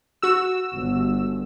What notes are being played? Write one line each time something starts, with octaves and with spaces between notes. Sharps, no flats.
F#4 E6
G1